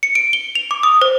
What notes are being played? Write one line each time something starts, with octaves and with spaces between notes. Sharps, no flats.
C#7
D7
G7
F7
D6
D#6
C5